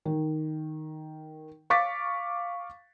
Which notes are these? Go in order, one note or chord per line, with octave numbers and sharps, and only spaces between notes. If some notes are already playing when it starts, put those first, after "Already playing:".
D#3
F5 C#6 D6 A6 B6